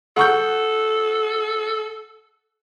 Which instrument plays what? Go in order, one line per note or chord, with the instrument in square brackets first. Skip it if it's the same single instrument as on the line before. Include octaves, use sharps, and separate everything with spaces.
[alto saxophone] A4 [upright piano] F#5 C#6 G6